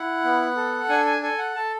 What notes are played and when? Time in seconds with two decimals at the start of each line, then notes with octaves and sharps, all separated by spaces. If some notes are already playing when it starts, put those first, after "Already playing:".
Already playing: E4 F#5
0.24 B3
0.56 A4
0.89 D4 G#5
1.06 G#5
1.22 A4 G#5
1.38 F#5
1.55 A4 A5